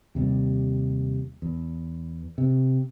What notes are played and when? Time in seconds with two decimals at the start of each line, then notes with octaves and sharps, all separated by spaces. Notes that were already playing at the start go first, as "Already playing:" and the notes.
0.15 D#2 C3 G3
1.42 E2
2.38 C3